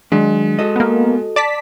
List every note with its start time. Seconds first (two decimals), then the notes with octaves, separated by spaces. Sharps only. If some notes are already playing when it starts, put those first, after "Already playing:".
0.12 D#3 F#3 G#3 D4
0.59 F#4 A4 D#5
0.76 A#3 B3
1.36 D5 A5 B6